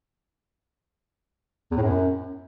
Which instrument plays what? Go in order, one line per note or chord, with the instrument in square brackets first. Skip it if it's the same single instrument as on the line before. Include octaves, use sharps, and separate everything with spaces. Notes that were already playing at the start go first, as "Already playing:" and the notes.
[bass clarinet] E2
A2
F#2